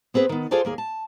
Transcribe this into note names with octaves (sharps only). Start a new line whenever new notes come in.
B3 C4 G#4 B4
D#3 B3
F4 G#4 A4 C5 D5
D#2 A#3 G#4
A5